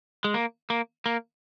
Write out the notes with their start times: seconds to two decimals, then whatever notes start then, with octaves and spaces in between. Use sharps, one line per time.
0.24 G#3
0.34 A#3
0.70 A#3
1.06 A#3